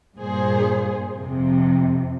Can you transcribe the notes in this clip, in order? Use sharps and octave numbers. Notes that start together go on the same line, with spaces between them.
G2 A#2 G#4 C5
F2 C3 F3